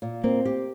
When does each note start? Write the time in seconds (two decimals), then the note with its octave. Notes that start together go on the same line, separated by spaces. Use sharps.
0.02 A#2
0.24 A#3 C4
0.45 G4